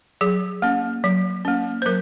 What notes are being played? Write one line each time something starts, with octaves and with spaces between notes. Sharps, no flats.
F#3 G#4
A#3 C#4
F#3
A#3 C#4
C5
F#3 A#4